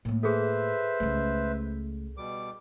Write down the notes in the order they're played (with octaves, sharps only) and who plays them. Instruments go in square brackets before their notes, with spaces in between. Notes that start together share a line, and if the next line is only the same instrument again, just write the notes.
[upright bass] A2 A#3
[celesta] G#4 A4 [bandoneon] B4 C5 E5
[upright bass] C#2 A3
[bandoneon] B2 G3 D6